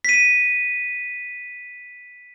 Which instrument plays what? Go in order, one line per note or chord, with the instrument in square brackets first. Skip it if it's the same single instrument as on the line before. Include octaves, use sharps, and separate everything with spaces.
[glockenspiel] B6 D#7